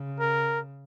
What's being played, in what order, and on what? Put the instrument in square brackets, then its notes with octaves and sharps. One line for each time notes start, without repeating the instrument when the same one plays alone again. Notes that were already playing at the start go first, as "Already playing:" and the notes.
Already playing: [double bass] C#3
[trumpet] A#4